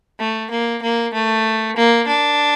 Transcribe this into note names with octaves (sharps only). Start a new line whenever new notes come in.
A3
A#3
A#3
A3
A#3
D4